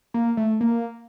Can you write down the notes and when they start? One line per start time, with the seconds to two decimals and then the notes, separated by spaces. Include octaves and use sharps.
0.14 A#3
0.37 A3
0.61 A#3